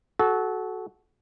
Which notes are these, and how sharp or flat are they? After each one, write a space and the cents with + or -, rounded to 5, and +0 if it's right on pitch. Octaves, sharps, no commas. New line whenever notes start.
F#4 +5 A4 -25